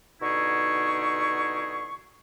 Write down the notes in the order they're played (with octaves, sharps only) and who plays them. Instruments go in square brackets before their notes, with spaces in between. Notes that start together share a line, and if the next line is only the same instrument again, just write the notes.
[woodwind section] B2 D3 D#4 E4 G#4 C#6